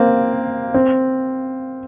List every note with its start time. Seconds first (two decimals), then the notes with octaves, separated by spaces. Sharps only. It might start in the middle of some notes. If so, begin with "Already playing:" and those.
Already playing: A#3 C4
0.74 C4